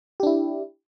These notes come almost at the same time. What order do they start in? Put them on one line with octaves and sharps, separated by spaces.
G4 D4 E4